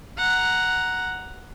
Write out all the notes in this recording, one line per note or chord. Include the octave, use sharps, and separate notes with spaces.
F#5 A#5